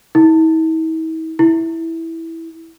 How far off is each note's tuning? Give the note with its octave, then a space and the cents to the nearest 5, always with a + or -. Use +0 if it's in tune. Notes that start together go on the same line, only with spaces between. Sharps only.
E4 -45
E4 -10